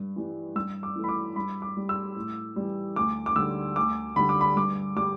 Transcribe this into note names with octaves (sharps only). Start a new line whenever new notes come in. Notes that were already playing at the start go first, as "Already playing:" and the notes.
Already playing: G2
E3 G3
G2 E6
D6
E3 A3
B5
D6
G2 B5
D6
G3
E6
A2
E3 G3
D2 D6
D6
D3 G3 E6
D2 D6
D3 G3 B5
D6
B5
G2 D6
G3 D6